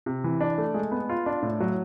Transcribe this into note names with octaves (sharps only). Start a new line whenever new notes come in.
C3
E3
D4
A3
G#3
B3
F4
D4
A2
F#3